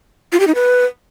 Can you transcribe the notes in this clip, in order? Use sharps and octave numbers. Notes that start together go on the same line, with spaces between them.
F4
G4
D#4
B4